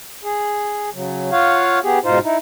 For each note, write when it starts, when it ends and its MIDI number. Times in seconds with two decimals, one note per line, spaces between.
0.24 0.90 68
0.94 1.30 49
0.94 1.30 54
1.32 1.79 65
1.32 1.79 73
1.32 1.79 77
1.32 1.79 78
1.83 1.99 59
1.83 1.99 67
1.83 1.99 68
2.04 2.19 44
2.04 2.19 47
2.04 2.19 63
2.04 2.19 65
2.04 2.19 72
2.23 2.37 63
2.23 2.37 64